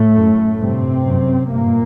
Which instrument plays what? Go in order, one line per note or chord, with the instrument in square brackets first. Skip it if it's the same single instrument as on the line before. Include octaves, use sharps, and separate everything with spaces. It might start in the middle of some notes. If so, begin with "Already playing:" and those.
Already playing: [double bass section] A2 A3
F#2
G2 C3 C4
F#2
G2 A#2 A#3